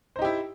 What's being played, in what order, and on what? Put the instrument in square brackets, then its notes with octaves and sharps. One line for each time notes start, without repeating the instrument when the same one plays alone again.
[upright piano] C5
D#4
G4
E4